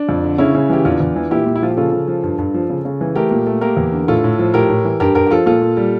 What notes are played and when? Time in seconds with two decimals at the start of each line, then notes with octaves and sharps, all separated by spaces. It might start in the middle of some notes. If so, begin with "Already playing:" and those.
Already playing: D4
0.09 F2
0.24 D3
0.38 C#3 C#4 E4
0.55 C#3
0.70 E3 G4
0.85 E2 D4 F4
1.00 E2
1.16 E3
1.31 A#2 E4 G4
1.46 A#2
1.56 E4
1.62 F3 F4
1.70 G4
1.77 C#3 F4 A4
1.92 C#3
2.08 F3
2.24 G2
2.39 G2
2.54 F3
2.70 C#3
2.85 C#3
3.01 E3
3.16 A3 G4 A#4
3.31 A#2
3.46 A3
3.61 A#3 G4 A#4
3.77 E2
3.92 D3
4.08 A2 F4 A4
4.24 A2
4.39 F3
4.54 A2 G4 A#4
4.69 A2
4.85 E3
5.00 G2 G4 A#4
5.15 G2 G4 A#4
5.27 G4
5.31 F3 F4 A4
5.46 A#2 F4 A4
5.62 A#2
5.77 G3